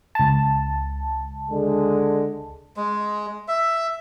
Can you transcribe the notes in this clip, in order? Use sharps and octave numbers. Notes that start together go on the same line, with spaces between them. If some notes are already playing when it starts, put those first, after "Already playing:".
C#2 A5
D3 G#3
G#3
E5